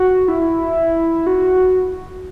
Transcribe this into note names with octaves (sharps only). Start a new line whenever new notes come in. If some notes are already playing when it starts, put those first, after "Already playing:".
Already playing: F#4
E4
F#4